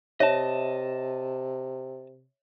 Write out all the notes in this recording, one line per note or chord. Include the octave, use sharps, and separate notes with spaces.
C3 C#5 D#5 E5 A5